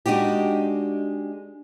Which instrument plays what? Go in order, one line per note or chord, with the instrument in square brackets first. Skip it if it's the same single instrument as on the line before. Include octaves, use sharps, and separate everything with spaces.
[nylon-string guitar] G#3 D4 D#4 F#4 G4